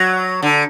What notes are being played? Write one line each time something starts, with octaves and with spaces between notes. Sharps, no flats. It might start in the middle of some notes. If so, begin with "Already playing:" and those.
Already playing: F#3
D3